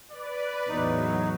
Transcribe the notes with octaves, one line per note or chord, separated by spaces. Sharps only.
B4 D5
E2 A2 F#3 D#4